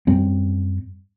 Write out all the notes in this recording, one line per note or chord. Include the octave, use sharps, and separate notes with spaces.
F#2 G3 C4